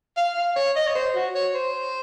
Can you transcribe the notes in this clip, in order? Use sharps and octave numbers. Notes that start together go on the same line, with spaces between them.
F5
F5
C#5
D#5
C#5
C5
F#4
C#5
C5